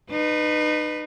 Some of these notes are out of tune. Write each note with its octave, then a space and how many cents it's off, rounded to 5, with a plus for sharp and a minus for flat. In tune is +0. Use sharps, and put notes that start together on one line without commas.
D#4 -35 B4 +0